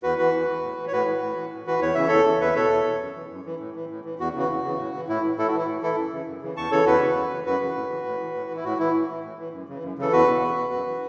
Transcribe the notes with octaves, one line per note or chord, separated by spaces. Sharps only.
E2 F#4 B4
E3 F#4 B4
E2
E3
A2
E3
C#5
A2 F#4 B4
E3
A2
E3
A2
E3 F#4 B4
E2 C#5
C#3 E3 E5
E2 A4 C#5
C#3 E3
E2 B4 E5
B2 A4 C#5
E2
B2
F#2
E3
F#2
E3
A2
E3
A2
E3
E2 F#4
C#3 E3 F#4
E2
C#3 E3
A2
E3
A2 E4
E3
A2 E4 A4
F#4
E3
E4
A2
E3 E4 A4
F#2
C#3 E3
F#2
C#3 E3
E2 A5 C#6
C#3 E3 A4 C#5
E2 F#4 B4
C#3 E3
F#2
C#3 E3
F#2 F#4 B4
C#3 E3
A2
E3
A2
E3
A2
E3
E4
A2 F#4
E3 E4
A2
E3
A2
E3
F#2
C#3 E3
F#2
C#3 E3 A4
E2 F#4 B4
B2
E2
B2
F#2
E3